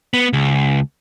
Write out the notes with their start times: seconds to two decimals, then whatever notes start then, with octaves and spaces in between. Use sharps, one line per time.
0.14 B3
0.33 C#2